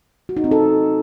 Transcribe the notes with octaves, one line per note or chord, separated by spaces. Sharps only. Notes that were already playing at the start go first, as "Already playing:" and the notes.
F#4
D#4
C4
A4